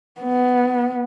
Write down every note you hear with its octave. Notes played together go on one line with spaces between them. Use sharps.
B3